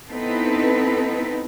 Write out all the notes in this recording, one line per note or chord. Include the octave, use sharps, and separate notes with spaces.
B3 C4 D#4 E4 A4 B4